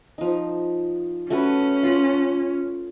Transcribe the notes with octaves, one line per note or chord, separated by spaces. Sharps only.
F3 D#4
A3 C#4 F#4 B4
F4 F#5